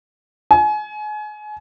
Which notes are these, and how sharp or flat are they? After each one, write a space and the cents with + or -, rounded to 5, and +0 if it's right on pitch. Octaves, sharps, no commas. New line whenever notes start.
G#5 +30